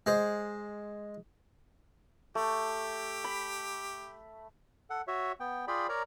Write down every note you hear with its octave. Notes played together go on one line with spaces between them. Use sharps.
G#3 C5
A3 G4
B5
A4 F#5
F#4 C#5 E5
B3 G5
F4 G#4 D5 G5 B5
A#4 C#5 D5 A#5